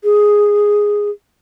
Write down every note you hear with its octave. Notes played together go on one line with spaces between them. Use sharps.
G#4